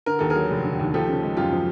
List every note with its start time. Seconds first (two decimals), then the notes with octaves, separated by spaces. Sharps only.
0.06 D3 A#4
0.19 D#2 A4
0.30 G#4 A#4
0.36 F#3
0.50 F1
0.64 D3
0.80 D#2
0.94 F3 G4 A4
1.08 C#3
1.23 G#3
1.37 F#2 F4 G4
1.52 F3